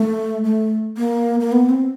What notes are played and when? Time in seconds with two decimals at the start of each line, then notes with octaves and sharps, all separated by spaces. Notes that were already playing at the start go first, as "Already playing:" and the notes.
Already playing: A3
0.44 A3
0.97 A#3
1.40 A#3
1.52 B3
1.70 C4